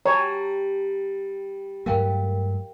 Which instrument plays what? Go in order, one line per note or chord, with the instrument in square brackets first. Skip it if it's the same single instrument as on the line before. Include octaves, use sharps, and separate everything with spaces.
[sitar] G3 [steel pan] C#5 [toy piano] A5 A#5
[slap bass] G2 F#3 A3 [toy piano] A#4 F5 G5